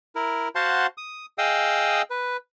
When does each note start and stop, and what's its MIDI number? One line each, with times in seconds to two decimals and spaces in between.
0.15 0.48 64
0.15 0.48 70
0.55 0.87 66
0.55 0.87 72
0.55 0.87 77
0.55 0.87 78
0.55 0.87 81
0.55 0.87 84
0.98 1.26 87
1.38 2.02 68
1.38 2.02 75
1.38 2.02 77
1.38 2.02 79
1.38 2.02 87
1.38 2.02 88
2.10 2.37 71